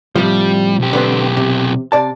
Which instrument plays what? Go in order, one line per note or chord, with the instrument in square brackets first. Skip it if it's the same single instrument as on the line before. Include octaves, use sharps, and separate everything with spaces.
[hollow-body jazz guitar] A2 C3 F3 [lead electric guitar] G3
[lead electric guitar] B1 G4
[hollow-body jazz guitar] D3 B3 C4
C3
C3 D5 A5